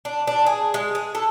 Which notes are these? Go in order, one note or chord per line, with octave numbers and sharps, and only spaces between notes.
D4
D4
G#4
G#3
G#4
A4